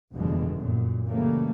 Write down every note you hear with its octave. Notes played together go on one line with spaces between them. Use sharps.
F1 G2 B2 D3 E3 G#3
F#2 A#2
C#3 E3 F#3 G3 A3 A#3